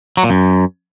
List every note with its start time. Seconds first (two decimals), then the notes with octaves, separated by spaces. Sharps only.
0.17 F#3
0.24 A#2
0.30 F#2